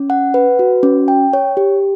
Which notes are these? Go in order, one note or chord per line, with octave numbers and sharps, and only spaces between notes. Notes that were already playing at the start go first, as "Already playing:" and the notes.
Already playing: C#4
F#5
B4
F#4
C#4
G5
C#5
G4